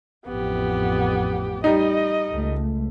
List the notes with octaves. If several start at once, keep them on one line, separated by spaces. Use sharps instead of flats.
A1 F2 B3 G4
G3 D#4 D#5
C#2 A3